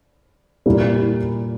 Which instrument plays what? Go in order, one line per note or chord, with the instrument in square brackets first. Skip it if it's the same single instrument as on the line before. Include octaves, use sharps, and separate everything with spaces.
[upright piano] A#2 G3 A#3 E4